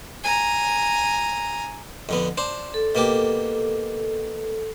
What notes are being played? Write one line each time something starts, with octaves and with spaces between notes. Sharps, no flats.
G#5 A#5
F2 D3 B3
D4 C5
A4
B2 A#3 G4